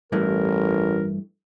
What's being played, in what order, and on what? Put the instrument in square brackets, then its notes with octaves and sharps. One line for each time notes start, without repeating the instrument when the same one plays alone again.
[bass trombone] A1 [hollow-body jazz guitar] G2 E3 A3 [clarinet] A#4